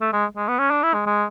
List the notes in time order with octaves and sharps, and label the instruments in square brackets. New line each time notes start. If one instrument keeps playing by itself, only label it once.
[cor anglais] A3
G#3
G#3
B3
C#4
D4
E4
G#3
G#3